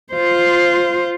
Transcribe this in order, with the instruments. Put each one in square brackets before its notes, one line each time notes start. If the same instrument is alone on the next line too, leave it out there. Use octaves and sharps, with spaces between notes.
[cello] F4 C5